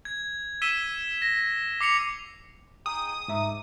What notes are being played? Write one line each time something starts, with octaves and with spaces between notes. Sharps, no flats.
G#6
E6 B6 D#7 E7 G7
A#6
D6 C7 C#7 F7
D#4 G#4 G5 D#6
G#2 D#4 E5 D6